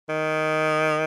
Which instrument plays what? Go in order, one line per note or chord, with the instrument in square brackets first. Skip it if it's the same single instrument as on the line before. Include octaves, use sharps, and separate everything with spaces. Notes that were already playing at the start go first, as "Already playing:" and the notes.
[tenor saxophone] D#3